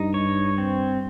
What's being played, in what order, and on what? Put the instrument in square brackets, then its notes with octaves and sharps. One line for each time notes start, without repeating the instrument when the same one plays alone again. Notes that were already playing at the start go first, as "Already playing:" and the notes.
Already playing: [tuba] G2 [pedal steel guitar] D#4
[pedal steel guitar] C#5
C4